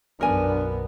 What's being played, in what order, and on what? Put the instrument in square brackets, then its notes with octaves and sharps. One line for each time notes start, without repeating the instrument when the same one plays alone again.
[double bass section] B1 F#2 B3 [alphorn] D4 [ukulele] A#4 G#5